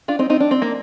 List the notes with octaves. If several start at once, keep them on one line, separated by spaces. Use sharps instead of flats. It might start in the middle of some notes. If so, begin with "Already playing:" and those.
D4 F4
C4 D#4
C4 D#4
D4
C4
A#3